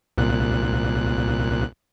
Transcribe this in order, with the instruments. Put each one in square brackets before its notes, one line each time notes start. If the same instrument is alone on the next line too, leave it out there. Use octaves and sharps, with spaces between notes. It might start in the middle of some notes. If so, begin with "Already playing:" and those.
[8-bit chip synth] C2 A#2 F#6